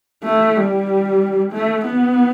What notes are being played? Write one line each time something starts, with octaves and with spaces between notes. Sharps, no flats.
A3
G3
A3
B3